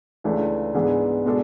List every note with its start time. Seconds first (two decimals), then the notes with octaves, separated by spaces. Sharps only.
0.24 C#2 C#3 E3 A3 D4
0.74 G#2 E3 B3 D4 G#4
1.26 B2 G#3 D4 A4